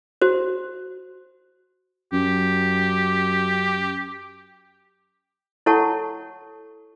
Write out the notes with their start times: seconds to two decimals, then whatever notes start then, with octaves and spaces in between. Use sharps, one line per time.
0.21 F#4 C5
2.13 F#2 G4
5.66 E4 A4 C#5 F#5 A5 C#6